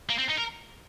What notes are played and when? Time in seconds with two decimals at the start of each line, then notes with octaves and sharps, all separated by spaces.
0.10 A#3
0.19 C4
0.30 D#4
0.38 A#4